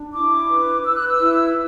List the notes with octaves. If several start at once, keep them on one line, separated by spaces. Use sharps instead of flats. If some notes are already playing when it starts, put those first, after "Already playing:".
Already playing: D4
E4 D6
B4
B4 E6
F#6
E6
E4